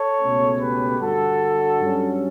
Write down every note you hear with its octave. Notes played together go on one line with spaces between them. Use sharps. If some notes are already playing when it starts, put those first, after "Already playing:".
Already playing: A4 C#5
C#2 B2 A3 C#4
G4 B4
G2 D3 G3 F#4 A4
G2 F#3 C#4